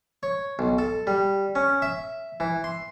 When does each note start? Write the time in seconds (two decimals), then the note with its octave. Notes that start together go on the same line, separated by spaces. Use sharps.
0.23 C#5
0.59 B1
0.78 A4
1.07 G3
1.55 C#4
1.82 E5
2.40 E3
2.64 C6